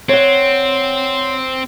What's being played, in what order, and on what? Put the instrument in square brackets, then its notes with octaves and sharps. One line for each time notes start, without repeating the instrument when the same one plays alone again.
[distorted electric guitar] C4 [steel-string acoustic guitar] C#5 D5 F#5